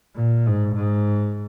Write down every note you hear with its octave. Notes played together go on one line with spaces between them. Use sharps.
A#2
G#2
G#2